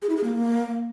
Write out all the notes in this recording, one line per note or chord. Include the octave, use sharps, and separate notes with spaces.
G#4
E4
G#4
A#3